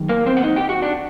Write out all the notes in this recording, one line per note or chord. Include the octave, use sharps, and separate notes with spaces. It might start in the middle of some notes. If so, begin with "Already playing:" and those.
Already playing: F#2 D#3
A#3 A#4
C4 C5
F#5
D#4 D#5
G4 G5
F#4 F#5
D4 D5